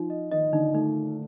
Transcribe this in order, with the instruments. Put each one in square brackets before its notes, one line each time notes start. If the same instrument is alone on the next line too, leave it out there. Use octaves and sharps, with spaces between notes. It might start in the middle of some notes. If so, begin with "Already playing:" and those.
Already playing: [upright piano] F3 F4 [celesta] D#4
[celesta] D#5
[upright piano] D#3 D#4 [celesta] D#5
[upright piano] D3 D4 [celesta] D#4
[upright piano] A3 [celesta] D#4